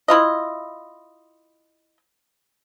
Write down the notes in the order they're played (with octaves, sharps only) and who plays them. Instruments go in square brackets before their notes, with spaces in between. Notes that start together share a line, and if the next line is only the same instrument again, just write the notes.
[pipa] E4 F4 D#5